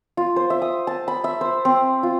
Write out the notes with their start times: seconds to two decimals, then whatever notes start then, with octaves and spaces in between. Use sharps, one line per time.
0.17 F4
0.36 C5
0.50 E5
0.62 D#6
0.87 A5
1.08 B5
1.24 E5
1.41 C5
1.65 C4
2.03 F4